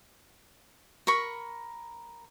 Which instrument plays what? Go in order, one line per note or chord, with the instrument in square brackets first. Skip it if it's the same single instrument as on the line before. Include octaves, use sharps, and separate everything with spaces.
[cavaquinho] A#4 B5 C#6